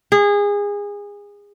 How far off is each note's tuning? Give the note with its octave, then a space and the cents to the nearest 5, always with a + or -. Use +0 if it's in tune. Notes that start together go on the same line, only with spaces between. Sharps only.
G#4 -25